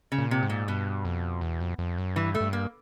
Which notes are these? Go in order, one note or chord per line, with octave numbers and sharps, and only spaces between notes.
C#3
A#2
C3
G#2
A#2
G2 B2
F2
E2
F2
F2
F#2
G2 E3
A3
G2
A#3